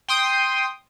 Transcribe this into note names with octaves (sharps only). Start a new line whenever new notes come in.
G5 C6 D#6